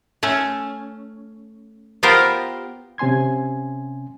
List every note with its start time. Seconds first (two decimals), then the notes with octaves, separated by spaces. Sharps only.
0.23 A3 C#4
2.03 B3 F4 G4 A#4 C5
2.98 C3 C#4 G#5 C6 G#6